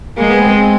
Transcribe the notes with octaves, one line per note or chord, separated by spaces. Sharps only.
G#3 A#3
B3
C4